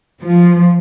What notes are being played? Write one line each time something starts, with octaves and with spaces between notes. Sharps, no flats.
F3